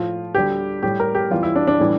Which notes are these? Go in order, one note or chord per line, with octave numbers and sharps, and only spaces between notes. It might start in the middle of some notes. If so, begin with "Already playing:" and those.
Already playing: A2 F3 F4
D2 D3 G3 G4
A2 G3 G4
A#4
G4
E2 E3 G3 F4
E4
D4
D4
A2 E3 G3